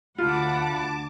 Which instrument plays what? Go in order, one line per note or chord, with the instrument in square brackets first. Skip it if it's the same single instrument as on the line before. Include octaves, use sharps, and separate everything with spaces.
[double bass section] D2 [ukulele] F4 [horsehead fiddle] F#5 B5 [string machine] A5 D6